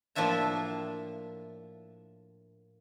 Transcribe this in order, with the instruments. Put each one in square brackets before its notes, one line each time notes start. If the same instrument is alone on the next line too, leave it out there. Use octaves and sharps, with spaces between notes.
[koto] A2 F3 A#3 D4 E5 A#5